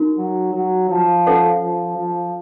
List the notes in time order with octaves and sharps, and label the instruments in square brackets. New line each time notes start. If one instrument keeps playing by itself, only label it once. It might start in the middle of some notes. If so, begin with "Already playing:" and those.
Already playing: [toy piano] D#4 F#4 A#4
[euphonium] F#3
F#3
F3
[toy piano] C#4 A4 C#5 F#5
[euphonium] F3
F3